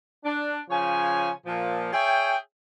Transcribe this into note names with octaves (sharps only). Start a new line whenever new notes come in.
D4
C#3 F3 C#5 G#5
A#2 F3
G#4 C#5 E5 G5